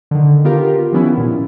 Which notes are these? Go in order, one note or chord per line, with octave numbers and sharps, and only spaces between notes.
D3 D#3
B3 F4 G4 A#4
D#3 F3 B3 C#4 E4
A#2